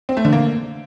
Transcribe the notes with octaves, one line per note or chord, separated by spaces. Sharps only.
C4
A3
D3
A#3